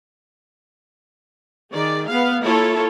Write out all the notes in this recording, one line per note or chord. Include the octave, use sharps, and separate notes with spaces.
D#3 G#4 D5
B3 F5
A#3 E4 F4 A4 C#5